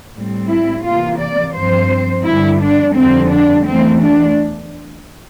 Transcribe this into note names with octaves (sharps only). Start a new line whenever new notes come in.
A2 G3 C4
E4
C3 E3 A#3 F4
D5
G2 F3 C4 C5
G2 D3 G3 E4
D4
F2 D3 G3 C4
D4
E2 E3 A3 C4
D4